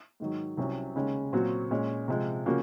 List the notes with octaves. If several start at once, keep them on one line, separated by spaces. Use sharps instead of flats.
G#2 D#3 F#3
C2 C3 F#3 C#4
D#2 C#3 G#3 C#4
A#2 F#3 C4 F#4
A#2 G#3 C#4
C3 F3 G#3
C#3 F3 A#3 C#4 F#4